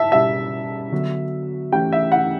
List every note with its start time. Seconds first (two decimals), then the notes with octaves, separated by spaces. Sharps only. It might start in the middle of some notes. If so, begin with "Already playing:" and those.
Already playing: E5 A5
0.12 B2 G3 C#4 G4 E5
0.92 D3 F#3 B3 F#4
1.72 E3 A3 C#4 G4 G5
1.93 E5
2.12 F#5